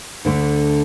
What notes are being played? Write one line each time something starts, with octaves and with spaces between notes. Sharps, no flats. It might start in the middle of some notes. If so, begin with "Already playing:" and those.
D2 D3 A3